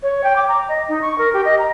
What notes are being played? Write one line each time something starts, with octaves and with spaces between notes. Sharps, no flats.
C#5
G5
D6
A#5
D#5
D#4
C#6
A#4
G4
D#5
A#5